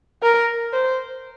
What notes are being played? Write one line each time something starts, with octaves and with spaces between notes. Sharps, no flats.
A#4
C5